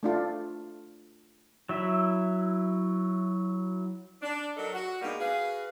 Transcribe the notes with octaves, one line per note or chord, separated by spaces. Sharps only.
A3 D4 F4
F#3 E4 E5
D4
F#3 D#4 F#4 A4 A#4
F#4
B2 G3 G#3 A#3 D4 D#4
F#4 G#4 B4 F5